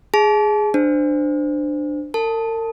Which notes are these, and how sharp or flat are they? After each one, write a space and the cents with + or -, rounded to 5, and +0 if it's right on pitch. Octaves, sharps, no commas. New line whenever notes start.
G#4 +0 A5 -35
D4 +20 C5 -15
A#4 -45 A5 +0